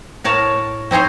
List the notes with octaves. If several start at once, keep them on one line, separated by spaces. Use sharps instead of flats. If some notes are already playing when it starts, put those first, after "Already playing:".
A2 A#4 C#5 A5
C4 D#4 G#4 C5 C#5